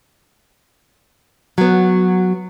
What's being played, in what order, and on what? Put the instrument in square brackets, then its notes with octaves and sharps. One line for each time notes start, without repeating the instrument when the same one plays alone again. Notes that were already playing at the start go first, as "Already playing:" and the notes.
[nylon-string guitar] F#3 B3